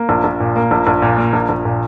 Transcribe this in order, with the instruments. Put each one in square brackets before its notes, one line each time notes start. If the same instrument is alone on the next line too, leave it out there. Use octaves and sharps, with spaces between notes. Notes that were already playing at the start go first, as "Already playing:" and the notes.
Already playing: [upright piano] A#3
A#1
A#1
A#2
A#3
A#1
A#1
A#2
A#3
A#1
A#1
A#2